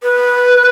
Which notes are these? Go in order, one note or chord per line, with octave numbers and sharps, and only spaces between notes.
B4